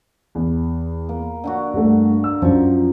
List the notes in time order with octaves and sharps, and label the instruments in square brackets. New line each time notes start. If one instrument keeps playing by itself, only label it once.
[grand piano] E2
[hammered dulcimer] A#3
D3 D4 F#4
[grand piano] G2 A3
E6
[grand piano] F#2 [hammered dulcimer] F3 C#6